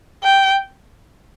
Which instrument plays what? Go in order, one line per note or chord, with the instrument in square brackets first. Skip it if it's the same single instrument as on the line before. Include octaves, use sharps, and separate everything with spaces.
[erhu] G5